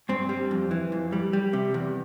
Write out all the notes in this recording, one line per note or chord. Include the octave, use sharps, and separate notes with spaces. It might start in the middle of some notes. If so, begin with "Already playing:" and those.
G2 C4
G3
F2
E3
F2
G3
G3
C3
E2